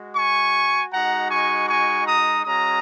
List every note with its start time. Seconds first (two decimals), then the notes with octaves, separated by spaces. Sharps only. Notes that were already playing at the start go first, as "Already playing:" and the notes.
Already playing: G#3 F#4
0.16 G#5 C#6
0.92 G#3 D#4 F#4 F#5 A#5
1.30 G#5 C#6
1.68 G#5 C#6
2.07 A#5 D#6
2.45 G#3 C#4 F#4 A#5 D#6